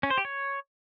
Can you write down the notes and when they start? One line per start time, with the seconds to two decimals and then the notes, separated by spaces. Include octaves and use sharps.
0.03 C#4
0.10 C5
0.18 G4
0.25 C#5